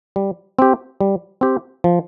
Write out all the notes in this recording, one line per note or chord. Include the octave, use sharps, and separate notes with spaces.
G3
C4 G4
G3
C4 G4
F3